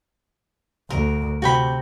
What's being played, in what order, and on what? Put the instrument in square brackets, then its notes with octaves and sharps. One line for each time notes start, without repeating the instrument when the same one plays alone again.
[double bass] D2 [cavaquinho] A#4
[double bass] C3 [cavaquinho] F#4 G5 B5